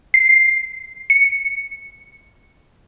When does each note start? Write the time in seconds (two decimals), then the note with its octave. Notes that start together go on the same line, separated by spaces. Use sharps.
0.14 C7
1.10 C#7